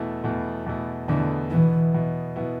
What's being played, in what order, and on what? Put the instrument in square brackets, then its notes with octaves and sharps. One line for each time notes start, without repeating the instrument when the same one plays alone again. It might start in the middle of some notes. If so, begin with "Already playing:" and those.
Already playing: [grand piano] E2 B2 A3 E4
E2 B2 A3 E4
E2 B2 A3 E4
[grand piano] E2 B2 A3 E4 [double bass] D3
[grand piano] B2 B3 E4 [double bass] E3
[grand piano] B2 B3 E4
B2 B3 E4